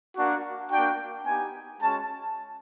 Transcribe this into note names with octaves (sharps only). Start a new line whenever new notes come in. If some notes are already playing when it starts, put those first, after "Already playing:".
A#3 D4 F#4
A#3 D4 F#4 G5
B3 D#4 G4 G#5
G#3 C#4 F#4 A5